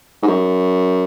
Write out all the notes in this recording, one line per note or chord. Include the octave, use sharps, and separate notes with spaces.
G#2
F#2